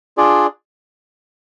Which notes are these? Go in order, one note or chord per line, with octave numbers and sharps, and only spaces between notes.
D4 F4 G#4 D5